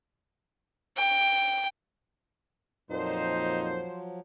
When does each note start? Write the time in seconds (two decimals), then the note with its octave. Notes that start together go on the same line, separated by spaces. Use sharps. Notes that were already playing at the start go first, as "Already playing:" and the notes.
0.97 G5
2.91 F2 A#2 F3 F#3 D#4 C5